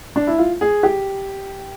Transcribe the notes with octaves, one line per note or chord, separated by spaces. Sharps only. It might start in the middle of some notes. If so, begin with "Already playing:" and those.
D4
E4
F4
G#4
G4